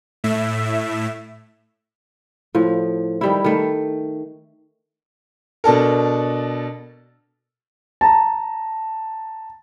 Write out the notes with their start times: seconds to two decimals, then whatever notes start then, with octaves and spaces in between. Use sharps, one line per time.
0.24 A2 E5
2.55 A2 F3
3.21 D#3 G3 E4
3.44 D#3 A3
5.64 B2 D4 A4 A#4
8.01 A5 A#5